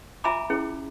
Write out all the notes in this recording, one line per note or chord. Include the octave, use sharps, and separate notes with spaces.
F4 E5 G#5 A#5 B5 D6
C#4 E4 G#4